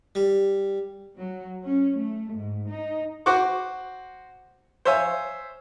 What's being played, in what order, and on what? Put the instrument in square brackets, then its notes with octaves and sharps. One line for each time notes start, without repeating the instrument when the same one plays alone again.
[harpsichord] G3
[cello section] F#3
C#4
A3
G#2
D#4
[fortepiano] F#4 C5 F#5 C#6 D6
C5 C#5 E5 F5 G#5